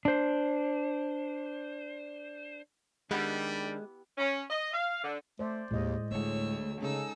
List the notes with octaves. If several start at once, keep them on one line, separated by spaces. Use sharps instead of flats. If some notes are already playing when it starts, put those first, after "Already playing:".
D4 C5
D#3 G3 G#3 B3 D4 E4 G4
C#4
D#5
F5
D3
A3 C5 D5
D#2 A2 G#3 D#5
D2 A2 D3 G#3 A3 C#5 E6
C#3 C#4 D#4 A4 E6